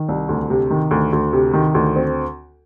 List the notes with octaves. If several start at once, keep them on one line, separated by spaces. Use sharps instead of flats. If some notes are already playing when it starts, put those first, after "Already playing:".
Already playing: D#3
C2
D2
C3
D#3
D2
D2
C3
D#3
D2
C4